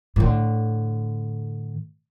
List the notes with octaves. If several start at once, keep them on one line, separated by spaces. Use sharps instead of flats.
A2 D3